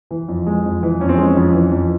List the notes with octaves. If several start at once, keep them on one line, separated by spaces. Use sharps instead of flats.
E3
F2
G#3
F2
E3
F2 C#4
C4
G#3 C#4
F2
E3
F2